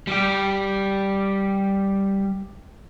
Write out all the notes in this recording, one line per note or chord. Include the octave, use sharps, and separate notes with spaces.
G3 G4